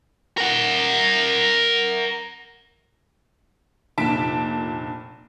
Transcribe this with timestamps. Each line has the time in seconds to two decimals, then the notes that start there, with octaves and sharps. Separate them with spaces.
0.38 A#4 F#5
3.98 F1 A#2 D3 A5 B6 D7